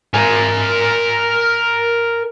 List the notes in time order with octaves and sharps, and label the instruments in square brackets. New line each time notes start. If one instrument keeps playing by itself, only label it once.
[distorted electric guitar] A#4 G#5